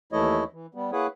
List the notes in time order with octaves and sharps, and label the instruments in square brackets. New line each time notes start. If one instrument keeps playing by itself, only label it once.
[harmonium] D#2 E3 A3 E4 C#5 D#5
E3
G3 B3
A#3 E4 G#4 B4 C#5 F#5